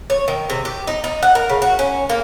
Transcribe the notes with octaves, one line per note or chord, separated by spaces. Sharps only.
C#5
D#3
C3
G4
D#4
D#4
F#5
A#4
C#3
F#4
C#4
A#3